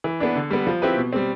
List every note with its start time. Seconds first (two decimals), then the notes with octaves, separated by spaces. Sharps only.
0.04 E3
0.20 B3 D4
0.35 D3
0.50 G3 B3
0.67 F3
0.82 C4 E4 G4 B4
0.97 B2
1.13 G3 C4